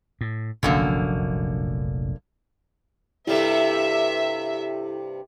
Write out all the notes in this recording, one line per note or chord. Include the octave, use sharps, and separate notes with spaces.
A2
F1 A#1 F#2 D3 A#3
G2 C3 G3 E4 A4 E5